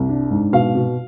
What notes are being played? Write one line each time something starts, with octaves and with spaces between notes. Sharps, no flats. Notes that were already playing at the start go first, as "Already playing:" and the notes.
Already playing: C2
D4
G#2
B2 F5
B2